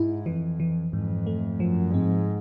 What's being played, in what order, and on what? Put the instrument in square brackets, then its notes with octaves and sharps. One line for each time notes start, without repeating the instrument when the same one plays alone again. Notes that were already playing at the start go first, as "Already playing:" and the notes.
Already playing: [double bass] G#2 [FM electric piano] E4
[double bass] F2 [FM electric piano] E3
[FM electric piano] E3
[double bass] F2 [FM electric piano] G#2
[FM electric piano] A3
[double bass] F#2 [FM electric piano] F3
[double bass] G#2 [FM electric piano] C4